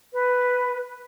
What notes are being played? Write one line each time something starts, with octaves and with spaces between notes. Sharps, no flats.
B4